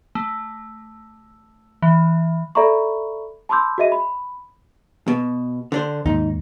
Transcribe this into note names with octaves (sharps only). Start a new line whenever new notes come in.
A3
E3
A4 D5 E5 A#5 B5 C#6
A5 B5 C6 D6 E6 G6
F#4 G#4 D#5 E5 D#7
B5
B2
D3 D4 C5
D#2 G#2 D#4